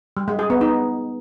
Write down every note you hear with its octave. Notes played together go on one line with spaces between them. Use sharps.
G3
G#3
G#4
B3
D#4